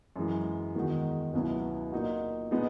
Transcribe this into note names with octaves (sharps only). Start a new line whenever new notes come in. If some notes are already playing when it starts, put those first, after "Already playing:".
F#2 E3 G#3
E2 D#3 G#3 D#4 F#4
C#2 B2 F#3 B3 E4
A#2 A#3 D#4 F#4
A#2 G#3 B3 D#4